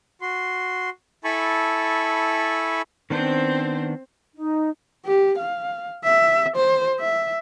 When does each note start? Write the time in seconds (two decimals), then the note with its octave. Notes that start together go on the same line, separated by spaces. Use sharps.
0.22 F#4 C6
1.24 E4 A4 G#5 A5 B5 C#6
3.10 D#3 B3 C4 D4 C5
4.34 D#4
5.06 G4
5.38 F5
6.04 E5
6.56 C5
7.00 E5